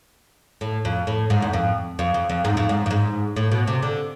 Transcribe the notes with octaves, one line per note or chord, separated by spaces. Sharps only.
A2
F2
A2
G#2
E2
F2
F2
F2
F2
G#2
F2
G#2
F2
G#2
A2
B2
C3
D3